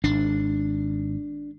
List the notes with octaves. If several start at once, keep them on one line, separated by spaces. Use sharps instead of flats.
G#1 D4